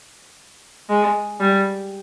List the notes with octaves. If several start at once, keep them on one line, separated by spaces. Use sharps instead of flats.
G#3
G3